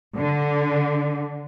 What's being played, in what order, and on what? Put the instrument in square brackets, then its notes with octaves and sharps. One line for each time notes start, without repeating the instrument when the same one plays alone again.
[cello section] D3